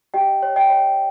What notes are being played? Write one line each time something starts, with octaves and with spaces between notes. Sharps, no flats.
G4 D#5 G5
C#5
D#5 G5
C#5